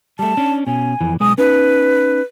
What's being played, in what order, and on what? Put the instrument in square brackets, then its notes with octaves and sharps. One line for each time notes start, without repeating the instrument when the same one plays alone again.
[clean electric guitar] G3 A3 [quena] A5
[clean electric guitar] C#4 D4
[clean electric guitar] B2 C#4 [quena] G#5
[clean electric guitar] F2 E3
[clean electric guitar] B1 G#3 G#5 [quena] D#6
[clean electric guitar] C#4 D#4 [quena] B4